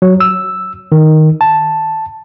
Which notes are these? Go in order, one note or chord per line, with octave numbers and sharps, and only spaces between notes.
F#3
E6
D#3
A5